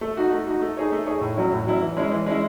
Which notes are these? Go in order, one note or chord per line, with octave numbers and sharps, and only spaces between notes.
A3
D#4 F#4
A3
D#4 F#4
A3
D#4 G#4 C#5
A3
D#4 G#4 C#5
A2
F#3 C#4 E4
A2
F#3 C#4 E4
E3
G#3 C#4 E4
E3
G#3 C#4 E4